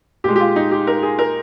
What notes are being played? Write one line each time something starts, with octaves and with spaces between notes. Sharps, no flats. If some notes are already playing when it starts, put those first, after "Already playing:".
A#2 G#3 G4
G4
F4
D#4
G4
A#4
G#4
A#4